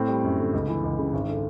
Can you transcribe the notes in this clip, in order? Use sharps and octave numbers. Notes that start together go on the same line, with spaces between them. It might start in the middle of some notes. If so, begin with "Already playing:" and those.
Already playing: A2 C4
G3
F#2
D3
C#2
E3
C#2
C#3
G#1
D3